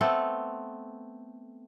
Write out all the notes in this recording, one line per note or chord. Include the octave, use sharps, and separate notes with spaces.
A3 B3 C4 A4